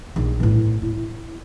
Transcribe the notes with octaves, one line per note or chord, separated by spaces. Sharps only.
A#1 D#4
A2 E3
E4